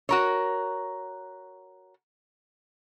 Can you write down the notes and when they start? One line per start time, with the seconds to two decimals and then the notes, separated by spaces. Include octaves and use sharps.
0.09 F#4 A#4 C#5